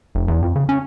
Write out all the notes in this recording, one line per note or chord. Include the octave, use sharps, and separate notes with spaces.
F1
E2
F2
C#3
C#4